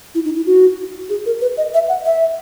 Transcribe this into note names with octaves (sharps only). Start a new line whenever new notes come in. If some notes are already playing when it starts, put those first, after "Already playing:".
E4
D#4
E4
F#4
G#4
A#4
B4
D#5
E5
F#5
E5